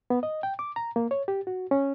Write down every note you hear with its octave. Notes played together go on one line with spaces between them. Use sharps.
B3
D#5
G5
D6
A#5
A#3
C#5
G4
F#4
C#4